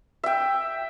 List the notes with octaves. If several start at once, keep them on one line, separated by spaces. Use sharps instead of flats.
E5 G5